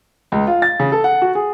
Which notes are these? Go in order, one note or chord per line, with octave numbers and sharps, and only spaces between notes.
C#2
F4
A6
C#3
A4
F#5
F#4
G#4